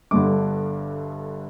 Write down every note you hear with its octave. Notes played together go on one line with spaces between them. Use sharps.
G1 G2 D3 D6